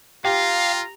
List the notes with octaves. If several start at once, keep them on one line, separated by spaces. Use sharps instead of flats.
F4 G4 F5 A#5